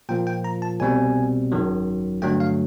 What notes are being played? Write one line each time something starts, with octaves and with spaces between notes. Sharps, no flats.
A#2 F3 A#3 G5
G5
A#5
A5
C2 B2 G3 C4 G#5
G#1 F#2 D#3 F#3
G2 D3 F#3 A3 G5
F5